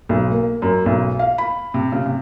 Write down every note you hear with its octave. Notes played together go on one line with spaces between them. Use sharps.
B1
A#3
F#2
B1
F5
B5
C3
C#3
C3